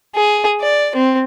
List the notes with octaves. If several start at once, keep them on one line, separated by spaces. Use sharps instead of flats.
G#4
D5
C4